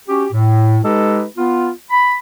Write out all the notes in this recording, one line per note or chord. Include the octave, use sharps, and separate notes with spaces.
C#4 F#4 G4
A2
G#3 D#4 G4 A4 B4
B3 F4
B5